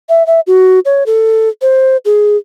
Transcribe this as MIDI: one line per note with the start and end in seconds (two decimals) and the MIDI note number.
0.09 0.26 76
0.27 0.40 76
0.47 0.79 66
0.85 1.04 73
1.06 1.49 69
1.62 1.97 72
2.05 2.37 68